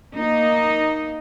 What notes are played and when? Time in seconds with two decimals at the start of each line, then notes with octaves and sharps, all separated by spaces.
0.16 A#3 D#4